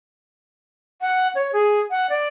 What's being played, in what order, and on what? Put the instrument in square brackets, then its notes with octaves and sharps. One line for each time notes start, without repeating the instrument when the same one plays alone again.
[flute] F#5
C#5
G#4
F#5
D5